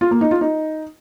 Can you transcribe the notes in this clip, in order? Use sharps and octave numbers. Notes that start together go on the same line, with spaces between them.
F4
A#3
D#4
F4
D#4